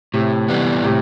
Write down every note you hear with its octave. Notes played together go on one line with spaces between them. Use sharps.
A2 C3
E3 G3 B3
A2 C3